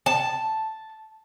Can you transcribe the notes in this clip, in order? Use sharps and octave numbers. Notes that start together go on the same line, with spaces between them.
A5